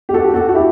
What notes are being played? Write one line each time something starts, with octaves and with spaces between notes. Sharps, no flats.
G4
F#4 A4
G4
F#4 A4
F#4
E4 G4